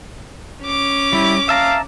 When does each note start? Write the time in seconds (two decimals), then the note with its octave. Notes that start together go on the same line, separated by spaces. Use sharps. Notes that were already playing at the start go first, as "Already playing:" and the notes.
0.65 C#4 D6
1.13 G3 E4
1.49 E5 F5 A5 A#5